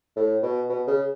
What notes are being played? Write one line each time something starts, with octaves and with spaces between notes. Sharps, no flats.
A2
B2
B2
C#3